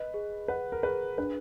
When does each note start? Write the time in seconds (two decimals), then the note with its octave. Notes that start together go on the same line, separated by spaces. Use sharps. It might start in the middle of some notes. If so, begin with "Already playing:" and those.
Already playing: B4 D#5
0.14 G#4
0.48 B4 F#5
0.72 A#4
0.83 G#4 B4
1.18 D4 B4